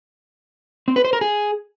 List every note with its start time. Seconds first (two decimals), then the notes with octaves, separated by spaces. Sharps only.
0.88 C4
0.96 B4
1.05 C5
1.13 A#4
1.21 G#4